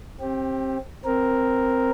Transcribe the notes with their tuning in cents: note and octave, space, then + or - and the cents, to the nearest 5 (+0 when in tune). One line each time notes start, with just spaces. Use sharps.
C4 +25 G4 +0
C4 +0 A#4 +0